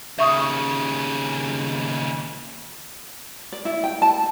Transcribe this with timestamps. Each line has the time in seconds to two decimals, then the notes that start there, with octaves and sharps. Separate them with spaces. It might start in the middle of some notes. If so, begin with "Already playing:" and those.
0.19 D#2 C#3 E5 C#6 D#6
3.52 D5
3.65 E4
3.84 G5
4.02 A5